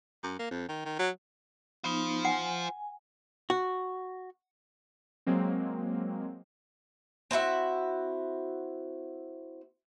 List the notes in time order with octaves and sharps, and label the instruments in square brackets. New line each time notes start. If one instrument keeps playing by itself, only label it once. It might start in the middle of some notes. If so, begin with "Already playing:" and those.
[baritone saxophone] F#2
A#3
F2
D#3
D#3
F#3
[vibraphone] B3 D#4 [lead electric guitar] F4 C5
[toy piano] F#5 [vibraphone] G#5
[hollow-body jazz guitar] F#4
[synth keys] F#3 G#3 A#3 C4
[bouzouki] C4 E4 F#4 E5